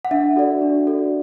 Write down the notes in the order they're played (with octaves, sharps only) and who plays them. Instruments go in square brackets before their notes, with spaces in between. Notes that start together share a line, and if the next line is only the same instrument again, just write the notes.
[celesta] F#5
D4 E5
F#4 A4 D5
D4
F#4 A4 D5